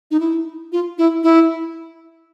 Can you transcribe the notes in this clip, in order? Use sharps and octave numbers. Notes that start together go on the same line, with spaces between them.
D#4
E4
F4
E4
E4